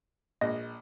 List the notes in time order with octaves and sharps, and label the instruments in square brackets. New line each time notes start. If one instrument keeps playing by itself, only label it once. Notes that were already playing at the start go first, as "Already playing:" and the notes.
[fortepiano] A#1 [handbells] D#5